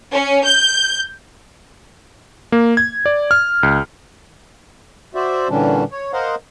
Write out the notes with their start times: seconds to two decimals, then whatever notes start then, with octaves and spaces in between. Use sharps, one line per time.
0.12 C#4
0.45 G6
2.52 A#3
2.77 G#6
3.06 D5
3.31 F6
3.63 C#2
5.15 F#4 C5 D5 E5
5.49 A#2 D3 E3 G3 C#4 D4
5.92 C#5
6.13 A#4 C5 D#5 F5 F#5